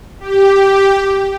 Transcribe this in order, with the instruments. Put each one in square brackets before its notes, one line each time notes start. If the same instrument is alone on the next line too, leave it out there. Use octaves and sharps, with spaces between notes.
[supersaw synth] G4